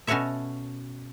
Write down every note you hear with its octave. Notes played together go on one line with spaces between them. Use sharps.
B2 C#4 F#4 A4 C#5 E5